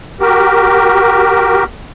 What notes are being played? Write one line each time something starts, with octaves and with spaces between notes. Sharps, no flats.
F#4 G4 A#4